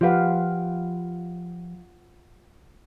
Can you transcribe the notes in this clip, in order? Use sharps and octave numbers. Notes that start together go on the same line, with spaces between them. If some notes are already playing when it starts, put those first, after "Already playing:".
F3 F4 G4 B4 F5 F#5